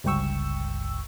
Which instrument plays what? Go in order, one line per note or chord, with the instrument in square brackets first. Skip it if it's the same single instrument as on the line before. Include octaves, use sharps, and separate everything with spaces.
[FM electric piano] G1 C#2 G2 G5 C#6 E6